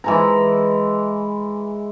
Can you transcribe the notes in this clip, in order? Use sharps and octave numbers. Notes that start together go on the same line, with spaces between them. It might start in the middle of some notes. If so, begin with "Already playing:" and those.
E3 G#3 A#5